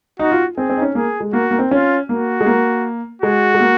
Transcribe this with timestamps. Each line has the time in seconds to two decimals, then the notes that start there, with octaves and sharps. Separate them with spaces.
0.19 D#4 F#4
0.32 F4
0.57 C4 G#4
0.70 C4
0.77 D#4
0.82 C#4
0.95 A#3 G#4
1.20 G#3
1.33 A#3 F#4
1.51 A#3
1.59 C4
1.71 C#4 F4
2.09 A#3 F#4
2.41 G#3
2.46 A#3
3.22 G#3 F#4
3.54 G#3
3.60 A#3